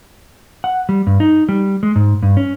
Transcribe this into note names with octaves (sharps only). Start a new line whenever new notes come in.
F#5
G3
G2
D#4
G3
G#3
G#2
G2
C#4